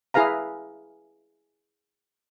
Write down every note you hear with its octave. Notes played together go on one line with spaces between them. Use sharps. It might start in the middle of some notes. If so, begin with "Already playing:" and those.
E4 G#4 B4 F5 A#5